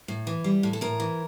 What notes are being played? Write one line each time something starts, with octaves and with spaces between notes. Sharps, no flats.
A2
E3
G3
A2
A4
A2 A#4
E3